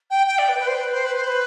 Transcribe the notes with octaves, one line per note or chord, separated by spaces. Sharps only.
G5
G5
D5
B4
B4
C5
B4
C5
B4
C5
B4